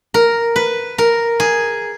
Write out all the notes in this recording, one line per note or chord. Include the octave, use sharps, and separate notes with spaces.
A#4
B4
A#4
G#4